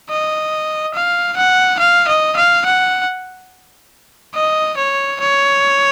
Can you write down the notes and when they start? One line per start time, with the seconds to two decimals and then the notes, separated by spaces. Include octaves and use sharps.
0.10 D#5
0.94 F5
1.37 F#5
1.80 F5
2.08 D#5
2.37 F5
2.65 F#5
4.35 D#5
4.78 C#5
5.20 C#5